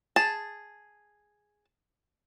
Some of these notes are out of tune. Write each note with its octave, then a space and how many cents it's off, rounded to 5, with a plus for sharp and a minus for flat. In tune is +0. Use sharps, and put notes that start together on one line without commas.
G#4 +0 A5 +0